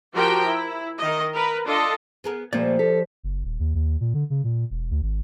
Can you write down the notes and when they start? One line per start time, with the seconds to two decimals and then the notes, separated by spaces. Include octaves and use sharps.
0.14 F3 F#4 G4 A#4 G5
0.46 E4
0.97 D#3 D#5
1.33 A#4 B4
1.66 D4 F4 A4 D#5
2.24 B3 G#4 A#4
2.53 A#2 F3 G3 A3 A#3 D5
2.79 G4 A4
3.23 F#1
3.44 D#1
3.59 D#2
3.75 D#2
4.00 A#2
4.14 D3
4.30 C#3
4.44 A#2
4.70 E1
4.91 D2
5.02 G#1